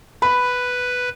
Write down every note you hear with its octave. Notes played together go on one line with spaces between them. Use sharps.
B4 B5